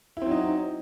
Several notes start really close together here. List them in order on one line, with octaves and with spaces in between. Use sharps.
E4 C4 F#3 D#4